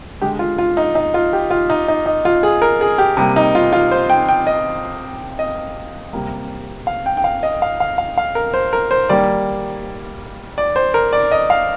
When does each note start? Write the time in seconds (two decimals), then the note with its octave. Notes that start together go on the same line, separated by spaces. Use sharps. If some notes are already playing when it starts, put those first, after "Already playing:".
0.22 D3 G#3 G4
0.39 F4
0.58 F4
0.77 D#4
0.95 D#4
1.14 F4
1.33 G4
1.51 F4
1.70 D#4
1.88 D#4
2.06 D#4
2.25 F4
2.43 G#4
2.62 A#4
2.81 G#4
2.98 G4
3.17 C3 G3 A#3
3.36 D#4
3.55 F4
3.73 F4
3.91 C5
4.10 G5
4.29 G5
4.47 D#5
5.39 D#5
6.13 C3 G3 A#3
6.87 F5
7.06 G5
7.17 G5
7.24 F5
7.43 D#5
7.62 F5
7.80 F5
7.98 F5
8.18 F5
8.35 A#4
8.54 C5
8.73 A#4
8.91 C5
9.09 D#3 G3 A#3 D5
10.58 D5
10.76 C5
10.94 A#4
11.13 D5
11.31 D#5
11.50 F5